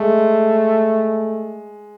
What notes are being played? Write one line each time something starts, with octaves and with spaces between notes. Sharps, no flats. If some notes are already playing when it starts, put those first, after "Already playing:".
Already playing: G#3 A3